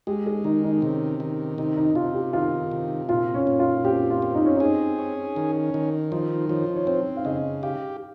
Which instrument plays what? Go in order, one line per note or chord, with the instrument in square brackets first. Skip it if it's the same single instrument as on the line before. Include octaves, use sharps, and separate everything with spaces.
[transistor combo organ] G#3 [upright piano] G4
[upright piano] G#4
[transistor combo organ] D#3 [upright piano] D#4
[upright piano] D#4
[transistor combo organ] C3 [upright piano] C#4
[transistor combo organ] D#3
[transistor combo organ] C3 [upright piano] D#4
[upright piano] D#4
[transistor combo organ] C3 [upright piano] F4
[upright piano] G4
[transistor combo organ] D#3 [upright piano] F4
[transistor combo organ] C3
[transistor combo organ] A#2 [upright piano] F4
[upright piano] C#4
[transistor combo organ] A#2
[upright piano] F4
[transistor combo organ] C4 [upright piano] G4
[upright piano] F4
[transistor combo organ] C4
[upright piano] D#4
C#4
[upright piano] D#4 [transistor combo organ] G#4
[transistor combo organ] C#4
D#3
D#3
[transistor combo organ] F3 [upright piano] D#4
[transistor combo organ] F3 [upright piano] C#5
[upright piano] C#5
[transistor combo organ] C4 [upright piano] C5
[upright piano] F5
[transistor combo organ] C#3 [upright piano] D#5
[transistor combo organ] G4 [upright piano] F5